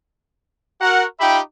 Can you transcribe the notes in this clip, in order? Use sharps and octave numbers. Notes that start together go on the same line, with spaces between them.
F#4 A#4 F#5
D#4 F4 G4 E5 G5 B5